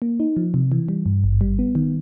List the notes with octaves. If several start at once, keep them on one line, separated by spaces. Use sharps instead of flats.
A#3
D#4
F3
C3
E3
G3
G2
G#1
G3
B3
D#3